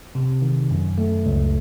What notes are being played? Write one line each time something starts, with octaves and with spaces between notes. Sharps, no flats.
C3
D#3
F#2
A3
C#2